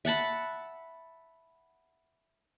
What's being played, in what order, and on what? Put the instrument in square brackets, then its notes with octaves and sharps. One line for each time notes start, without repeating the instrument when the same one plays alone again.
[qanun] E5 F#5 A5 B5